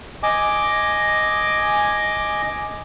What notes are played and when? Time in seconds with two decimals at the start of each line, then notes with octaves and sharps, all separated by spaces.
0.23 D#5 G#5 D6